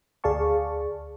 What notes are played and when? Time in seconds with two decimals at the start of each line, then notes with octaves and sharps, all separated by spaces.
0.24 D2 G#4 D5 F5 A5 C#6